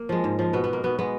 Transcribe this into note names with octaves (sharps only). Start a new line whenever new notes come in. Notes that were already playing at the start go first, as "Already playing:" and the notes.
Already playing: A#3
F3 G#3
G#2
F3 G#3
B2 B3
G#3 B3
A#3
B2 B3
G#3 B3